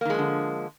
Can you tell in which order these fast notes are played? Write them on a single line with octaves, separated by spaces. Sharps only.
A#3 D#3 G#3 F3 D3